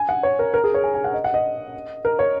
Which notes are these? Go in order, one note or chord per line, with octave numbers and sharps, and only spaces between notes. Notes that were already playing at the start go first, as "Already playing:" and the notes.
Already playing: G#5
F#5
C#5
A#4
A#4
G#4
C#5
G#5
G#5
F#5
D#5
F#5
D#5
A#4
C#5